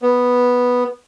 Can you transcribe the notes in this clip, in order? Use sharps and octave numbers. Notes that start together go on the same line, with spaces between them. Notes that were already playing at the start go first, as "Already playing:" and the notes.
B3